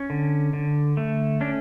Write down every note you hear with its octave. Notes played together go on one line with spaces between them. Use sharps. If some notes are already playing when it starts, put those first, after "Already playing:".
Already playing: C#4
D3
D3
A3
C#4 D4